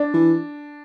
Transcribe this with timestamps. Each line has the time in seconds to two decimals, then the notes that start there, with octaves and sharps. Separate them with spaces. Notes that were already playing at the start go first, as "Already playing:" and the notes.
Already playing: D4
0.14 E3